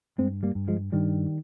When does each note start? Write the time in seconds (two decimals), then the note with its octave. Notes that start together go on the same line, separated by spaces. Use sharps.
0.18 G2 G#3 C4
0.43 G3 A#3
0.55 G2
0.68 F3 G#3
0.92 G2 D#3 G3